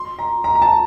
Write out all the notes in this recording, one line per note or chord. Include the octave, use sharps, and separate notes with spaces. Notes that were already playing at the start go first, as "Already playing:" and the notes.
Already playing: C6
A#5
A#5
A#5
A5